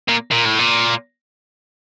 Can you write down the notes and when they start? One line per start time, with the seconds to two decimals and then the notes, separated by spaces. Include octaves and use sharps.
0.09 A#2
0.32 A#2
0.46 A2
0.59 A#2